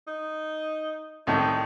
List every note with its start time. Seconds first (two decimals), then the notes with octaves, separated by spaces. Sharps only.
0.07 D#4
1.27 C2 A2 D#3 D#4